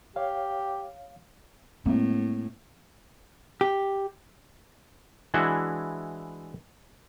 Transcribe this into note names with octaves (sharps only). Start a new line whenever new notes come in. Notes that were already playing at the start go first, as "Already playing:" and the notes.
G4 C#5 F5
A2 G#3 A#3 C4
G4
E3 G#3 D4 E4 F#4